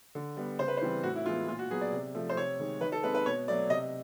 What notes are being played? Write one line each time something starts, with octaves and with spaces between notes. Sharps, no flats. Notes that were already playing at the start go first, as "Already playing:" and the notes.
D3
G3 B3
C#3 C5
B4
C5
E3 G3 C4
A2 F#4
E4
E3 G#3 B3 F4
A#2 F4
F#4
F#3 B3 G#4
D5
C3
F3 A3
C5
C3 C#5
D#3 G#3
D#3 B4
A4
G#3 C4 B4
B4
B2 C#5
F#3 A3 D5
C3 D#5